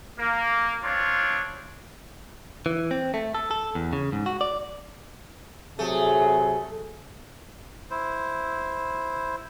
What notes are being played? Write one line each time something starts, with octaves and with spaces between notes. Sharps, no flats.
A#3
C4 D4 F4 C#5
E3
C4
A3
A4
A4
E2
C#3
G#2
F#4
D5
C3 F#3 A3 G#4
E4 C5